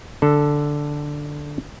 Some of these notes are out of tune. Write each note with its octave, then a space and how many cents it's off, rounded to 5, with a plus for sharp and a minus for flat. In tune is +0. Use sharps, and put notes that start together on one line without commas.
D3 +0 A4 +0